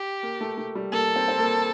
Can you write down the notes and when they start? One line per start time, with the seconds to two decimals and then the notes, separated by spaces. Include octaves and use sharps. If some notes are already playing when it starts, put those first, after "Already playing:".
Already playing: G4
0.23 A#3
0.41 A3
0.58 A3
0.75 G3
0.92 A#3 A4
1.16 C4
1.28 C4
1.38 A#3